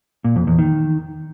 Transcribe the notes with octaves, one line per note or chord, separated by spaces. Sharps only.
A#2
F2
E2
D#3